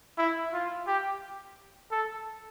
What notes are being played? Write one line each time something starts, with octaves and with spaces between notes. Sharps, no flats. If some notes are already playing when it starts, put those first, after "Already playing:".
E4
F4
G4
A4